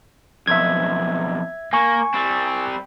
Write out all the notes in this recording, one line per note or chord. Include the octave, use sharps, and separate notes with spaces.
B1 F2 E5 G#6
A#3 G#5 C#6
G3 C4